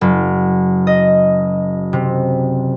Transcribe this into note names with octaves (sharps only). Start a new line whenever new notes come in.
F#1
D#5
C3